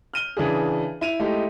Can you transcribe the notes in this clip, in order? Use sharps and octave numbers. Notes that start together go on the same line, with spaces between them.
F6 D#7 G7
C#3 E3 D4 G#4
E4 D#7 F7
G#3 A3 D#4 E4 G4